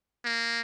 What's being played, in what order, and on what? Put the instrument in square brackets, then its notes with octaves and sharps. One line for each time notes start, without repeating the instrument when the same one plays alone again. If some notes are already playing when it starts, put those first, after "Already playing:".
[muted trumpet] A#3